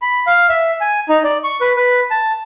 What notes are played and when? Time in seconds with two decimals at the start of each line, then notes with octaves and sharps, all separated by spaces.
0.02 B5
0.27 F5
0.49 E5
0.81 G#5
1.09 D#4
1.24 D5
1.44 C#6
1.61 B4
1.76 B4
2.11 A5